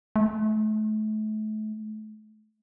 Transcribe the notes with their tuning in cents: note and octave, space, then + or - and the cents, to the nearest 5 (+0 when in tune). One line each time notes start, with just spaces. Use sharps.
A3 -35